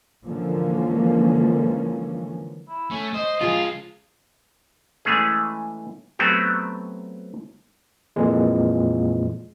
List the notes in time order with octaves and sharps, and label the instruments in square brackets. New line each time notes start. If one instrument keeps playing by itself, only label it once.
[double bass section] D3 E3 F3 G#3 A#3 C#4
[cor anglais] E4
[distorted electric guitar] A3 [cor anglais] C#4
[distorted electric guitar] C5 [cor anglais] D#5
[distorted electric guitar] C#2 [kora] F3 G#4 [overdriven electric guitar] F4
[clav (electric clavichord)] E3 G#3 A3 C#4 G#4
F#3 A3 B3 C4 F#4 G4
[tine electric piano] F2 A#2 E3 G#3